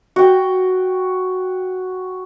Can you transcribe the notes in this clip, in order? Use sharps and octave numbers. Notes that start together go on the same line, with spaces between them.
F#4 G5